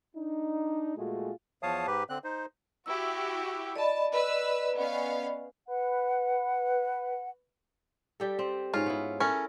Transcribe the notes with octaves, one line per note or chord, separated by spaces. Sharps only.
D4 D#4
A#2 G#3 A3 F4 F#4 G#4
E2 F3 C#5 F5 A5 D#6
G#2 G4 B4
D3 C4 F#6
D#4 C5
E4 F#4 G4 E6
D5 D#5 A5 B5
B4 E6
B3 C#4 F5
B4 F#5
G3 G4 A4
C4
G#2 C#4 F4
B3 E4
C#4 E4 A4 A#4